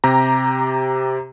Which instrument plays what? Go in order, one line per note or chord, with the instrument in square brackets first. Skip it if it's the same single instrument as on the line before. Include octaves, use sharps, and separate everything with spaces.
[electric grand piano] C3 G4 A#5